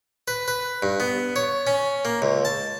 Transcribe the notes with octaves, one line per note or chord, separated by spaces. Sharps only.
B4
B4
G2
B3
C#5
C#4
A#3
C#2
A5